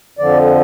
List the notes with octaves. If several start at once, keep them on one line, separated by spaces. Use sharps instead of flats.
F2 D3 F3 D5